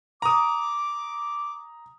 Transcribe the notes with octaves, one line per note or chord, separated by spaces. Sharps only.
A#5 D6 D#6